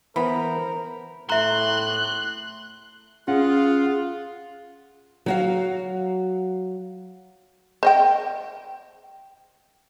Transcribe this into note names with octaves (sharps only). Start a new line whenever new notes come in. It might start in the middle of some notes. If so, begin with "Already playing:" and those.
E3 B3 A#4 C5 B5
A2 E5 A#5 C6 F#6
C#4 F4 G#4 F#5
F#3 F#4 F5
C5 D#5 G5